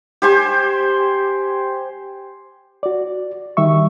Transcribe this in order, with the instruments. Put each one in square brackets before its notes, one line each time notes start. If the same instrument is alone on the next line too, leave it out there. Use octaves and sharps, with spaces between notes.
[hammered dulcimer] G4 C5 G#5
[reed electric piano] F#4 D5
D#3 G3 E5 C#6